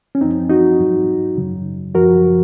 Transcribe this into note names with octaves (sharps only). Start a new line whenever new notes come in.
C#4
F#2 F3 C4 D#4
D#4 F#4
G#2 F#3
F#2 C#3 F#3
F#2 F3 F#4 A#4